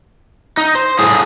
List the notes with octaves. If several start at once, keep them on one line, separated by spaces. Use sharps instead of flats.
D#4
C5
A2 G#4